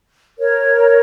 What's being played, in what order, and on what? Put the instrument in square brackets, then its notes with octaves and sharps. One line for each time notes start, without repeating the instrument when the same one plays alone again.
[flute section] A#4 C#5